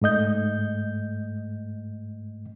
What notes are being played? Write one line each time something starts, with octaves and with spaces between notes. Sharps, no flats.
G#2 A3 D#5 G6